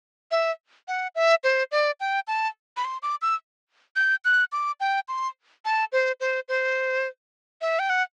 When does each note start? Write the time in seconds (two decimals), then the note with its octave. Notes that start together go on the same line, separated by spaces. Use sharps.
0.31 E5
0.88 F#5
1.15 E5
1.44 C5
1.72 D5
2.00 G5
2.28 A5
2.77 B5
2.85 C6
3.03 D6
3.22 E6
3.96 G6
4.25 F#6
4.52 D6
4.80 G5
5.08 C6
5.65 A5
5.92 C5
6.20 C5
6.49 C5
7.61 E5
7.79 G5
7.90 F#5